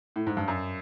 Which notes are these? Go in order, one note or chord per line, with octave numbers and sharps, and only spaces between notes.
A2
G#2
G2
F#2